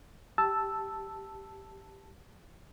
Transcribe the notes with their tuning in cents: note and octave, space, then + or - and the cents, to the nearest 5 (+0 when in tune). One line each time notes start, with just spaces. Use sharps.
G4 +0 A5 +0 E6 +0